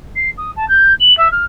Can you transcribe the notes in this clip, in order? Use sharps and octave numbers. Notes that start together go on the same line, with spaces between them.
C7
D#6
A5
G6
F#7
E5
F6